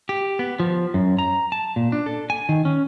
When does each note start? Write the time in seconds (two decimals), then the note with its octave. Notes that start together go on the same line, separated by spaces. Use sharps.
0.09 G4
0.39 B3
0.60 F3
0.94 F#2
1.19 A#5
1.52 A5
1.76 A#2
1.92 D4
2.06 A4
2.30 G#5
2.49 D#3
2.65 C#4